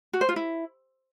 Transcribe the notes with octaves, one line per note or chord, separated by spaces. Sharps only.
F#4
C5
F4
E4